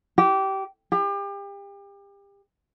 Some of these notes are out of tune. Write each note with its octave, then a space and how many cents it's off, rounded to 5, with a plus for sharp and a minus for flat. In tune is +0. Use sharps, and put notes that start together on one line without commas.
G4 -20
G4 +35